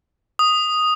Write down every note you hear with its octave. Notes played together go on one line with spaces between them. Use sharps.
D#6